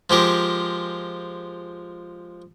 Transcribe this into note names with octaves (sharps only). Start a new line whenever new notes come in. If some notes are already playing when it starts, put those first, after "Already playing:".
F3 G#3 G4 A#4